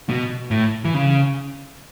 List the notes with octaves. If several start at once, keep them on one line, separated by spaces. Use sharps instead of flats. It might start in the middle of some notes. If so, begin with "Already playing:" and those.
B2
A2
E3
C#3